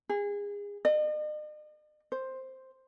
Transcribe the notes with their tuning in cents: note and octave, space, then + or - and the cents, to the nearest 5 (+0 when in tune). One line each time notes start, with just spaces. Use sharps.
G#4 -30
D#5 -45
C5 +5